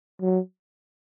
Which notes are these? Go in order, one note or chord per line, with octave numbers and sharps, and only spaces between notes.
F#3